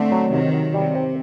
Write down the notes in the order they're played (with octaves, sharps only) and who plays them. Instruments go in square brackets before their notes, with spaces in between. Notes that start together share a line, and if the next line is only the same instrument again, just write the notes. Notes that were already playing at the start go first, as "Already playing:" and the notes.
Already playing: [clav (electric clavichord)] D3 [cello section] A3 C4
[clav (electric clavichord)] F#3
[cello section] C3 D#3 [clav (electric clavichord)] D#4
[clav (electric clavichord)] F#3
[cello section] C3 [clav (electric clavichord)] G3
[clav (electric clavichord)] C4